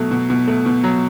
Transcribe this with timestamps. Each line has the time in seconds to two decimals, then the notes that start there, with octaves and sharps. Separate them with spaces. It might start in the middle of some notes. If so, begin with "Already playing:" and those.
Already playing: B2 F#3 A3
0.11 B2
0.30 B2
0.47 A3
0.66 B2
0.84 F#3